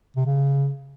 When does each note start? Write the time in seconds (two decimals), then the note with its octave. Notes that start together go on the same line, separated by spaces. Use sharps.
0.16 C3
0.26 C#3